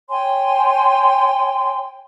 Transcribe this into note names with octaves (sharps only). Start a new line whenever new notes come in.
C#5 G5 G#5 C6